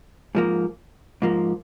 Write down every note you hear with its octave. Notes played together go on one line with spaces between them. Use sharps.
G#2 F3 A#3
G#2 F3 A#3